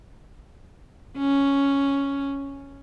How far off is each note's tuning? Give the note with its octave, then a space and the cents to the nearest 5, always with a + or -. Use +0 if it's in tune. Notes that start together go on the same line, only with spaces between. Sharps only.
C#4 +0